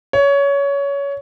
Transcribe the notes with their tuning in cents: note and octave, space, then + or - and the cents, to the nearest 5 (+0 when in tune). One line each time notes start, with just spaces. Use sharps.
C#5 +20